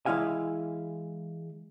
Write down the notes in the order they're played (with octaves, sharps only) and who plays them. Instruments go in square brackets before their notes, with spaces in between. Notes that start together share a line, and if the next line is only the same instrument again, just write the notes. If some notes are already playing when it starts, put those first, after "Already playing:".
[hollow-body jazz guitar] E3 G#3 E4 F5 G#5